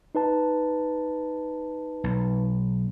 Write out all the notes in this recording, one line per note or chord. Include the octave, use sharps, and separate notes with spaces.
D#4 B4 A5
B1